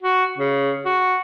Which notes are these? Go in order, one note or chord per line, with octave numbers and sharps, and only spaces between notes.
F#4
C#3
F#4